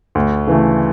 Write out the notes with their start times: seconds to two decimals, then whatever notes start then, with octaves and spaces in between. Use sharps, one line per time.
0.15 D2
0.47 C#3 E3 A3